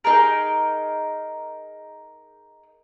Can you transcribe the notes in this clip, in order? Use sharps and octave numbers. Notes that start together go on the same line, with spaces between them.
D#4 G#4 A#4